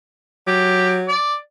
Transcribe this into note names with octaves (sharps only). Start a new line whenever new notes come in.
F#3 G4
D5